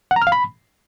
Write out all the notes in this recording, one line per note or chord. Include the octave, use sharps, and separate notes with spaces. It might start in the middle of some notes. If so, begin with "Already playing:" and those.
F#5
A#5
F6
F5
B5